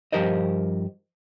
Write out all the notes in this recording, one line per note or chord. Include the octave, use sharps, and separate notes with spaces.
G2 F3 G4 A#4 C5 D#5